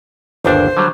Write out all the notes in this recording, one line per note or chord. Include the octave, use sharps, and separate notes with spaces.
G1 D#2 D4 C5
D3 F#3 G3